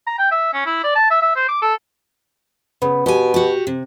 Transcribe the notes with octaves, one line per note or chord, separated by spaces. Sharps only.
A#5
G5
E5
C#4
E4
D5
A5
E5
E5
C5
D6
A4
C#3 B3
B2 G4 G#5
F#4 G4
C3